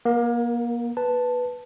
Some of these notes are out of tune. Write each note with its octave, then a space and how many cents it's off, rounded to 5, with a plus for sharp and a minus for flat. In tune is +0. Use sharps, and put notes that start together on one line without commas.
A#3 +35 A#4 +0
B4 +0 A5 +0